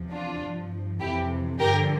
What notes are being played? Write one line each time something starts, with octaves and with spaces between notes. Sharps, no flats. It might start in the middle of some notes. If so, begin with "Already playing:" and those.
Already playing: E2 C3 F3
D4 F4
G2 F3
F2 C3 E3 E4 G4
G2 D3 F3 G4 A#4